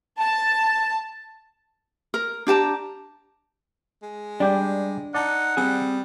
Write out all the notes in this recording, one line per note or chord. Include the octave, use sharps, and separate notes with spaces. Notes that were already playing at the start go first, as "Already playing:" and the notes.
A5
A#4
D4 G4 A5 A#5
G#3
G3 D4 G4 G5
D#4 D5 F#5 A5
G3 C4 G#4